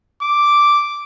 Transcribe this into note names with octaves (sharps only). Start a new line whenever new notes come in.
D6